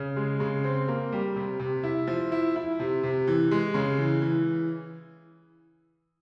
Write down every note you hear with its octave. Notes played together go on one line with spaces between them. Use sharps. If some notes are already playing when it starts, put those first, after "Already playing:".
Already playing: C#3
G#3
C#3
C4
A#3
G3
C3
C3
E4
F3
E4
E4
C3
C3
E3
G#3
C#3
E3
E3